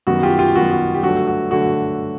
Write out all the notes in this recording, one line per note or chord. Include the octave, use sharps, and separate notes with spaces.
F#2 D#3 G3 B3 F#4
F4 G4
F4 G4
F#2 D#3 G3 B3 F#4
F#4
G4
G2 D3 F#3 A3 F#4
F#4
D3 F#3 A3 F#4